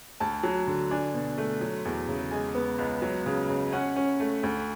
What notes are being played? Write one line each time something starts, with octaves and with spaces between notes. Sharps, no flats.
D2 A5
F#3
D3
D4 G#5
B2
A3
F#3
E2
C#3
G#3 G#5
B3
C#2
F#3
C#3
C#3
C#4 F#5
C#4
A3
D2